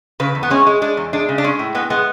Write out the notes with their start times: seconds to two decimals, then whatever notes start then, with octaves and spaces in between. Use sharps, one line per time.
0.20 C#3 B4
0.35 E2
0.43 B3
0.50 G#3 C#4
0.67 G#3
0.82 G#3 D4
0.97 E2
1.13 G#3 D4
1.29 C#3
1.38 D4
1.44 G#3 C#4
1.59 A2
1.75 G#3 B3
1.90 G#3 B3